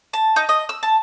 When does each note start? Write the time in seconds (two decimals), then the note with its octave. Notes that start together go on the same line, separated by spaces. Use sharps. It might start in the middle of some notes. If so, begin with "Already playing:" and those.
0.13 A5
0.36 D#4
0.49 D#5
0.69 E6
0.83 A5